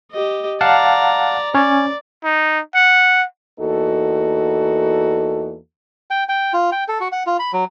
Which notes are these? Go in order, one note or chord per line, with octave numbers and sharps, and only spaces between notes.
G4 D#5
D5 F5 F#5 A5 A#5
C#4 C#5 D5
D#4
F#5
E2 A#3 D#4 F#4 A4
G5
G5
F4
G5
A4
F#4
F#5
F4
B5
F#3